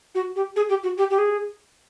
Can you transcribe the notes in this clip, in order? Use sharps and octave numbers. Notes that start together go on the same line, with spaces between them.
F#4
G4
G#4
G4
F#4
G4
G4
G#4